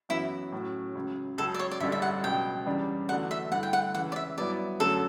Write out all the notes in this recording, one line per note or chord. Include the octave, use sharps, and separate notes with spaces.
F#2 E3 B3 E4 F#4
A2 F#3 C#4 F#4
C#2 C#3 F#3
C#2 C#3 F#3 A4
D5
C#5
D5
A1 G2 D3 G3 D4 E5
E5
F#5
C#2 B2 F#3 G5
E2 C#3 G3 D4
E2 D3 A3 D4 F#4 F#5
E5
G2 D3 A3 E4 F#5
G5
F#5
C#2 C#3 E3 F#5
D5
E5
G2 F#3 B3 E4 D5
F#2 D3 F#3 A3 A4